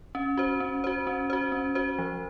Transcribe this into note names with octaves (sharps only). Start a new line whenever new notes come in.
C#4
F#4 C5
C#4
F#4 C5
C#4
F#4 C5
C#4
F#4 C5
F3